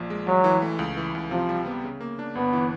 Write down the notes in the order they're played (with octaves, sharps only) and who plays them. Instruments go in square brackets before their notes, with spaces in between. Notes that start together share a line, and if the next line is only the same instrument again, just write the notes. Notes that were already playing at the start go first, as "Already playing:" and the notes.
Already playing: [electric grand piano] A#1 F3 A#3
G#3
[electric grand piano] A1 [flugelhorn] F#3
[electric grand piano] E3
A3
C#2
E3
C#2
[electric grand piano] C3 [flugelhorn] F3
[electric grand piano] G3
B3
C#3
A#3
D4
[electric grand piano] G1 [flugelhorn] B3
[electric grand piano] E3